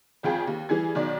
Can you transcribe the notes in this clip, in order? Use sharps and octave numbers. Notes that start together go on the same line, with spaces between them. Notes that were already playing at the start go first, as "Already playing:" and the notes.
G#1 F2 F4 G#4 G5
D#2
E3 G3 G#4 G#6
B1 D#3 D5